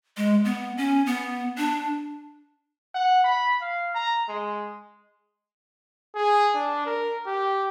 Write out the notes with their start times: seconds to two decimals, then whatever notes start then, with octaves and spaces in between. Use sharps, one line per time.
0.17 G#3
0.45 B3
0.77 C#4
1.06 B3
1.58 D4
2.95 F#5
3.24 B5
3.61 F5
3.95 A#5
4.28 G#3
6.15 G#4
6.55 D4
6.86 A#4
7.27 G4